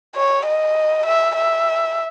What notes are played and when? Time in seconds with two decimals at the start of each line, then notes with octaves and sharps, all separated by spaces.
0.16 C#5
0.46 D#5
1.06 E5
1.36 E5